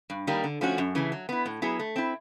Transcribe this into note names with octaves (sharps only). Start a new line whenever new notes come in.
G2
D#3 G3 A#3 D#4
D3
F3 A3 C#4 F#4
F#2
C#3 E3 A3
F#3
B3 E4
A2
F#3 B3 E4 G#4
A3
C4 E4